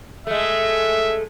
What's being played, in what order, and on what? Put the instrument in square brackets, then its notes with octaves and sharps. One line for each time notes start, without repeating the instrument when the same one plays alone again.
[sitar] G#3 A3 [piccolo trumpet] E5